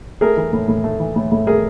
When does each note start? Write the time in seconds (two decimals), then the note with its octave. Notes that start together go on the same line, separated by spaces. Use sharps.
0.21 A3 G#4 A#4
0.37 E3
0.53 A2
0.68 A2
0.84 A3
1.00 E3
1.16 A2
1.32 A2
1.47 A3 G#4 A#4